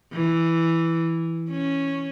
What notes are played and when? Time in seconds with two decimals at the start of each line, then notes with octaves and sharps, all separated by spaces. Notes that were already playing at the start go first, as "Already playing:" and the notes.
0.13 E3
1.50 C#4